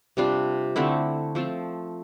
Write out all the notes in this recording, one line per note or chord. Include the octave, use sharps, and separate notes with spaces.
C3 G3 D4 F4
D3 A3 C4 E4
F3 A3 C4 F4